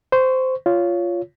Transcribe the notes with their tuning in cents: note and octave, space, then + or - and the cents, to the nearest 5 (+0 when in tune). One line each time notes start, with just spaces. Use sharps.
C5 -15 C#6 +0
F4 -5 C#5 +15